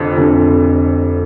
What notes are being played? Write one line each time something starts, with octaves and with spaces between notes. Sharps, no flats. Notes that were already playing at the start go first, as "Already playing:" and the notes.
Already playing: F1 F2 D3
F1 F2 D3